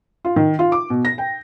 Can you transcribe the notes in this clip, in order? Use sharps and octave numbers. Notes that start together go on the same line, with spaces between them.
F4
D#3
F4
D6
B2
A#6
G5